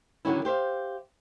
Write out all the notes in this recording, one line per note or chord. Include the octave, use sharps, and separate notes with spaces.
D3 D#3 F#3 G3 C#4 E4
G4 C5 E5 F5